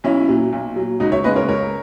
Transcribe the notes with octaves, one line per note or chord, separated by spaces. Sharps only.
B1 C#4 E4
A#2 F#3
B1
A#2 F#3
C#2 D#4 F#4
C#5 E5
C#3 G#3 B4 D#5
A#4 C#5
C#2 A#4 C#5